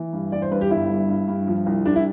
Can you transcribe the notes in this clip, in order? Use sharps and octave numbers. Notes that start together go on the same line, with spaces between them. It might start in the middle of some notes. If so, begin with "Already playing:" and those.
Already playing: E3
G2
E3 D5
C5
G2 B4
G4
G1 E4
G2
G2
G2
F3
C2
C2 D4
E4